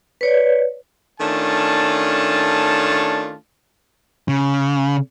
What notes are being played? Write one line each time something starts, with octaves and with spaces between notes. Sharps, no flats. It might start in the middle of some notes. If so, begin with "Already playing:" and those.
B4 C#5 D5
D#3 A3 C#4 D4 F4 A5
C#3